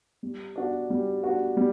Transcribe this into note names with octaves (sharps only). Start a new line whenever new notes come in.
G3
D4 F#4
G3
D4 F#4
G3